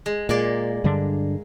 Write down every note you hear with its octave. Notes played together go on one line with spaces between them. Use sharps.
G#3
A#2 G#3 A#3 D5
G2 D3 D4